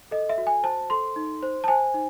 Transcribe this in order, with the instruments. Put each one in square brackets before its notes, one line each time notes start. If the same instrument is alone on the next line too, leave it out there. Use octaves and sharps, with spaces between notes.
[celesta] A4 D#5
E5
F#4
G#5
C5 A5
A4 C6
D#4
C5
A5
C5 G#5
D#4